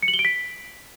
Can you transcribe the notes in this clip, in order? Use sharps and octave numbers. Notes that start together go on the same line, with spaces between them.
C#7
F#7
G7
D7
B6